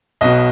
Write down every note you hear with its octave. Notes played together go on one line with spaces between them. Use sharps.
B1 B2 D#5